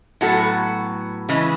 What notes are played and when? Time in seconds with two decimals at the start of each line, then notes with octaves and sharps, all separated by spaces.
0.21 A2 F#3 B3 F#4 A4
1.29 C#3 E3 G#3